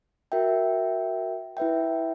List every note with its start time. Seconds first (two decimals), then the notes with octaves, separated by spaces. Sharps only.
0.32 F#4 A#4 E5 G5
1.57 E4 B4 E5 G5